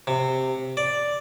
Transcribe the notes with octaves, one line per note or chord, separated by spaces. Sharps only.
C3
D5